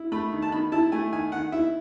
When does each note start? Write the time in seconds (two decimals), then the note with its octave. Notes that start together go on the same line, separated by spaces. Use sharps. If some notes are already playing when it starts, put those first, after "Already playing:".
Already playing: E4
0.12 A3 B5
0.32 D#3
0.42 A5
0.52 D#3 B5
0.72 E4 A5
0.92 A3 G#5
1.12 D#3 G#5
1.32 D#3 F#5
1.52 E4 E5